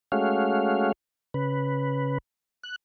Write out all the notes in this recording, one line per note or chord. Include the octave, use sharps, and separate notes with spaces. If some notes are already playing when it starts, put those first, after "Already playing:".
G#3 A3 C#4 F#4 F5
C#3 B4
F#6